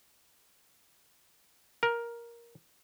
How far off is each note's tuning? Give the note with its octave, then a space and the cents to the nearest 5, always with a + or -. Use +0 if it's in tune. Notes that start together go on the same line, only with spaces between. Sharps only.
A#4 +10